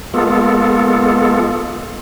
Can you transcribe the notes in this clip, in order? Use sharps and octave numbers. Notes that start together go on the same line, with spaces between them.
G#3 A#3 B3 F4 A4